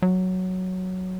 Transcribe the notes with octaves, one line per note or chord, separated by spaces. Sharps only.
F#3